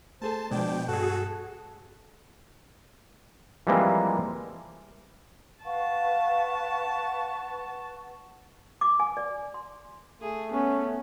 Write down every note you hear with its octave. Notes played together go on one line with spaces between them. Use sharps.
A3 G#4 A4 C5 A5
B2 F3 G#3 D4 G5
G2 F#4 G#4 A4 F#5 F#6
E3 F3 G3 G#3 A#3 C4
B4 F5 F#5 A5 C#6
D6
G#5
D5
C6
A3 G#4
B3 C#4